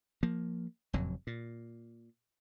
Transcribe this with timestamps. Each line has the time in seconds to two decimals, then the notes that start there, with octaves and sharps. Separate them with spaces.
0.23 F3 A#3
0.93 F#1 F2 A#2 F#3
1.27 A#2